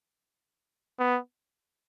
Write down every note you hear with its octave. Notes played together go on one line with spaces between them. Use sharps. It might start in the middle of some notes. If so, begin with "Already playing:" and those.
B3